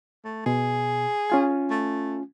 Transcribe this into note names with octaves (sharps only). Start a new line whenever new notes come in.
A3
B2 G#4
C#4 F4 G#5
A3